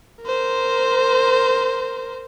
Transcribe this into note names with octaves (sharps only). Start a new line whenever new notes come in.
A#4 C5